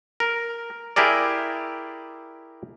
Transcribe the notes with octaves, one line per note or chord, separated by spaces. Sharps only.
A#4
E4 G4 G#4 A#4 D5